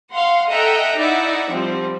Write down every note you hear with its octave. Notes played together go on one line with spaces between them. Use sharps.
F5 F#5 C6
A4 D#5 E5 F#5 G5 A#5
D#4 E4 D5 E5 F#5
F3 G3 C4